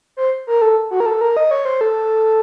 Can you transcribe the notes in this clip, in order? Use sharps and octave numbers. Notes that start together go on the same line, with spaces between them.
C5
A#4
A4
F#4
A#4
A4
A#4
D#5
C#5
C5
A4